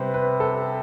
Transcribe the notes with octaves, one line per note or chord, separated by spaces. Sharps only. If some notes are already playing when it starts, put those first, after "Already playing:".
Already playing: C3 G3 B3 B4 C5
B4
A4